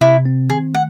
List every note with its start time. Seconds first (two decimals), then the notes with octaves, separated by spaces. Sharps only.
0.01 C3 E4
0.26 C4
0.50 D#3 G#4
0.74 A3 F#5